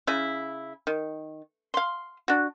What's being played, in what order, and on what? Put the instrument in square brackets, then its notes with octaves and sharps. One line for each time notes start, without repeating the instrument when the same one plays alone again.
[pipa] C#3 E4
D#3
F5 C6
D4 F#4